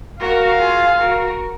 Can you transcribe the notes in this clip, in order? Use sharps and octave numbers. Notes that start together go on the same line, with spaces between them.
F#4 A#4 F5
F4 G#4
F#4 A#4